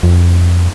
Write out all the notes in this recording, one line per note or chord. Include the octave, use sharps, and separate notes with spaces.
F2